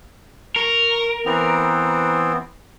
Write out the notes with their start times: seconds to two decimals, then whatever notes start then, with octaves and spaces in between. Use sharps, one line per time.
0.56 A#4 C#6
1.25 E3 B3 C4